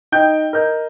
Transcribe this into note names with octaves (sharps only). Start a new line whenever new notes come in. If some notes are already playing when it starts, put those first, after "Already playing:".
D#4 G5 G6
A#4 D#5 G6